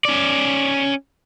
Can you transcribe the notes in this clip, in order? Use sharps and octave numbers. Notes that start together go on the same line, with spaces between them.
C#4 D5